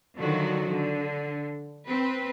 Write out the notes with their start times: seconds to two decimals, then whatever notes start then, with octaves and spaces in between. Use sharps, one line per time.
0.17 D3 D#3 F3 F#3 F#4
0.71 D3
1.86 C4 B4